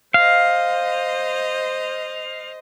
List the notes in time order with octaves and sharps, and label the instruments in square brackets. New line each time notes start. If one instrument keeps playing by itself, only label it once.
[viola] C5 D#5 [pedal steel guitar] F5